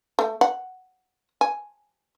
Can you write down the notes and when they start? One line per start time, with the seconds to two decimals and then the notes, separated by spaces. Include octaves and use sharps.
0.19 A3
0.41 F#5
1.41 G#5